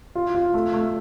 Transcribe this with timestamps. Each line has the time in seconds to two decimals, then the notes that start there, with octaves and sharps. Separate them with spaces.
0.15 F4
0.35 F4
0.54 A3
0.73 A3